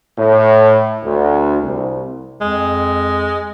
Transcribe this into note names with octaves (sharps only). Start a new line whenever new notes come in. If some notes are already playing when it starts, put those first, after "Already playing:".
A2
D2
C2
F2 G#3